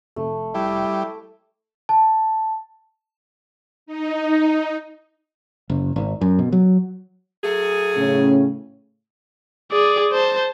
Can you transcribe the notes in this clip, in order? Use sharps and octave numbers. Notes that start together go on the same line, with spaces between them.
F1 A3
G3 E4
A5
D#4
F#1
G#1
F#2
B2
F#3
F#3 A3 G#4
A2 C#3 C#4
G#4 D5
C5 A5